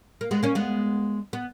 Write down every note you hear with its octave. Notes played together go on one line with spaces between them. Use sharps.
A#3
G#3 B3
A#3 C#4
G#3 B3
B3